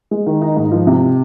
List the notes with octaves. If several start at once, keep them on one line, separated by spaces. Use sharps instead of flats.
G#3
D#3
D#4
G#2
F3
C3